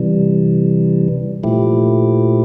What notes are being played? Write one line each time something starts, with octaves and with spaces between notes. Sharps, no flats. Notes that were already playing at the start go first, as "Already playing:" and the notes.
Already playing: C3 E3 G3
A#2 F3 A3 E4 G4